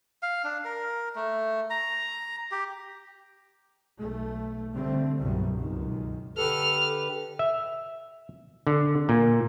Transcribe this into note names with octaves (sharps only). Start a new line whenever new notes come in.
F5
D4
A#4
A3
A#5
G4
B1 A3
D3 G3 A3 C4
G1 C2 F#2 B2 F#3 G3
C#2 F#2 B2 D#3
D3 G4 A4 B4 F6
E5
D3
A#2